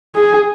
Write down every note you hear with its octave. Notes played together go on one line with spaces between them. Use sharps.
G#4